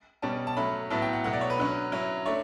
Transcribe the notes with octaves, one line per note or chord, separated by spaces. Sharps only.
B2 G3 C#4 A5
A5
F#3 A3 C#4 B5
A2 F#3 B3 E4 A5
G5
F#5
B2 F#3 A3 F#5
D5
C#5
B4
D3 F#3 C#4
F#3 C#4 E4
A3 D4 C#5